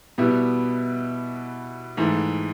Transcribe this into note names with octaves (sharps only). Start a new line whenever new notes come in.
B2 G3 B3 E4
G#2 E3 A3